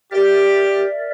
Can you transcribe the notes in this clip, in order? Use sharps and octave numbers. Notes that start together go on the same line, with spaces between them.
G4 A#4 D5 E5